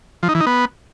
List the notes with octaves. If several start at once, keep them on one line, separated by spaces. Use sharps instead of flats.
F3
D#4
E3
D#4
B3